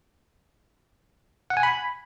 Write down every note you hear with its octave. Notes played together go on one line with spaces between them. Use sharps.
F#5
G#5
B5